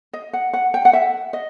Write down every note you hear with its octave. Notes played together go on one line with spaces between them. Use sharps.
D#5
F#5
F#5
G5
F#5
E5
D#5